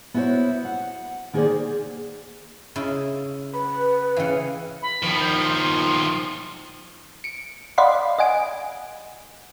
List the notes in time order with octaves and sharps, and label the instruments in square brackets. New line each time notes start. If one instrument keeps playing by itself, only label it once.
[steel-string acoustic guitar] B3 E4 F#4 G4 C5 C#5
F#5
D#3 A#3 G#4 B4 C5 D5
[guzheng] C#3 E4
[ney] B4 [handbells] B5
[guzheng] C#3 E3 [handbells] F5 G5 C#7
[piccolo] B5
[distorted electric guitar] D#3 F3
[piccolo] G6
C6
[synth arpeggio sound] C#7 D7
D5 D#5 F5 F#5 B5 C6
D#5 F#5 G#5 D7